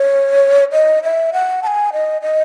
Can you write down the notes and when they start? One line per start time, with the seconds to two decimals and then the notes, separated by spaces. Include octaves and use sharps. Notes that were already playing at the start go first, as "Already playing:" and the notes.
Already playing: C#5
0.72 D#5
1.03 E5
1.33 F#5
1.63 A5
1.67 G#5
1.93 D#5
2.22 D#5